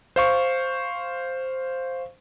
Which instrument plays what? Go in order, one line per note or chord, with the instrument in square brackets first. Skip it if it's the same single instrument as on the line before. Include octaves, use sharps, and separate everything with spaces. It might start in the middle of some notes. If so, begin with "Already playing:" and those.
[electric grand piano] C5 F5 C#6